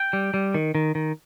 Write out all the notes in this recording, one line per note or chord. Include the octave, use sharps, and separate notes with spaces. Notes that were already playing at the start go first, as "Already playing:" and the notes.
Already playing: G5
G3
G3
D#3
D#3
D#3